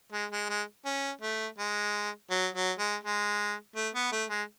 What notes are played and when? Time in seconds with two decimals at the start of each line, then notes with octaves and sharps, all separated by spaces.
0.12 G#3
0.31 G#3
0.49 G#3
0.85 C#4
1.21 A3
1.58 G#3
2.30 F#3
2.54 F#3
2.78 G#3
3.03 G#3
3.76 A3
3.94 B3
4.12 A3
4.29 G#3